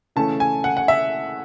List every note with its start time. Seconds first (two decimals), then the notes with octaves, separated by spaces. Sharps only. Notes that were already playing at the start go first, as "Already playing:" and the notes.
0.16 C#3 E3 A3 C#4 A5
0.40 G#5
0.64 F#5
0.77 F#5
0.88 E5